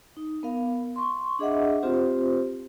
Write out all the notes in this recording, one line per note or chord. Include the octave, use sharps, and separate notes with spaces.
D#4
B3 A#4 F5
C6 C#6
D4 G#4 D#5 E5 F#5
C4 F4 G4 C5